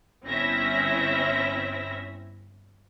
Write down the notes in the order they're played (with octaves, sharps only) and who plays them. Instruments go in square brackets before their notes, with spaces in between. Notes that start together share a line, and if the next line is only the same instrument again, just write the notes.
[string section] G1 C4 C#4 E4 E5 A#6